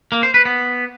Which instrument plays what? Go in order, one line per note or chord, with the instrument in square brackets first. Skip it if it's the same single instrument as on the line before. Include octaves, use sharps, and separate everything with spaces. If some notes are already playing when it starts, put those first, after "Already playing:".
[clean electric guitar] A#3
C5
B4
B3